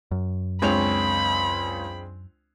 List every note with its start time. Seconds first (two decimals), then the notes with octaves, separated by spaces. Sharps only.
0.11 F#2
0.62 C#2 G#3 C4 D4 C#5 B5 F7